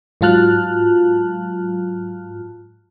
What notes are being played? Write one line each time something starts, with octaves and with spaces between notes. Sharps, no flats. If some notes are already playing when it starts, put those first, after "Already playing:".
G#2 F#3 F4 A5 F6 F#6